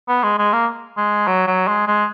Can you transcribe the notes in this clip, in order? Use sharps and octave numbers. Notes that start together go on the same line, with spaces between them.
B3
G#3
G#3
A#3
G#3
F#3
F#3
G#3
G#3